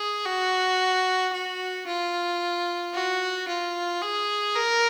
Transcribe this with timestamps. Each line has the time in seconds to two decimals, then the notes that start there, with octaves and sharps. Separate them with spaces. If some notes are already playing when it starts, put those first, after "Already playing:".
Already playing: G#4
0.25 F#4
1.33 F#4
1.87 F4
2.94 F#4
3.48 F4
4.01 G#4
4.55 A#4